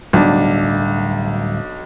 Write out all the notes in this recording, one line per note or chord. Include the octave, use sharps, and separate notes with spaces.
D1 B1 G3 D4